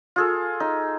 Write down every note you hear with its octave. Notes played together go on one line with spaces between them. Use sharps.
F4 G#4 A4
D#4